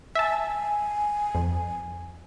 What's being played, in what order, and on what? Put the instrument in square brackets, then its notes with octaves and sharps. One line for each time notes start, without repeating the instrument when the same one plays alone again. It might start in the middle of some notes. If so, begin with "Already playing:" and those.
[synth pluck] E5 A5 [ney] G#5
[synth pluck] F2